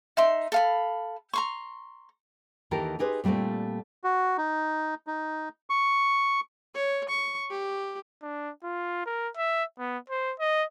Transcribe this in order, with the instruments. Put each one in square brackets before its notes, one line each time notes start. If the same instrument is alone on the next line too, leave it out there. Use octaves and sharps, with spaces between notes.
[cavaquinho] D#4 E5 C6
A4 F5 B5
A#5 C6 C#6
[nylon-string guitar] D#2 D#3 E3 G4 A4 A#4
D#4 G4 G#4 B4 C5
A#2 G3 A3 A#3 C4
[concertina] F#4
D#4
D#4
C#6
[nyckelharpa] C#5
C#6
G4
[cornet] D4
F4
A#4
E5
B3
C5
D#5